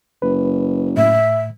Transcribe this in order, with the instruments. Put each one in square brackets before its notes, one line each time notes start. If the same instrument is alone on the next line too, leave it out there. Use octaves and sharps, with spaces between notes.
[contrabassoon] F#1 [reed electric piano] B4
[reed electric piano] A2 [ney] E5